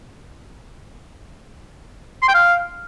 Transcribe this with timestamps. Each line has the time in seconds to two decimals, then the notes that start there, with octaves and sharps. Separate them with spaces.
2.22 C6
2.28 G5
2.34 F5